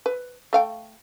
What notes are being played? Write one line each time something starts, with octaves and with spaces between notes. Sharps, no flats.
B4
A3 F5 G5